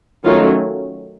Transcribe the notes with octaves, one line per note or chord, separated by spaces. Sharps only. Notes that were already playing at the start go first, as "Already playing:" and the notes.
D#3 F#3 A3 C#4 D#4 F4